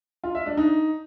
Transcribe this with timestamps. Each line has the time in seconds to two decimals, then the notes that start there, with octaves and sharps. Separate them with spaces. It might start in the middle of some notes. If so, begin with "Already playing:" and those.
0.24 F4
0.35 E5
0.46 D4
0.57 D#4